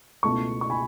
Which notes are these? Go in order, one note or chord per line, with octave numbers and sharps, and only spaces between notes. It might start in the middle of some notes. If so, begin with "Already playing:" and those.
C#2 B2 A3 E4 A5 C#6
C#6
G#5 B5